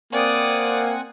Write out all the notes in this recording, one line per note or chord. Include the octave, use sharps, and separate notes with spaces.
A#3 C4 D5 F#5 G#5 D#6